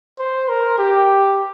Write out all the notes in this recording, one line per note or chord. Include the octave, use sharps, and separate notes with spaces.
C5
A#4
G4